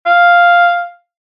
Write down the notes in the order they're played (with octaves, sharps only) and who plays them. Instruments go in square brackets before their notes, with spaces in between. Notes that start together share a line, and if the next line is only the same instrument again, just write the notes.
[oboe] F5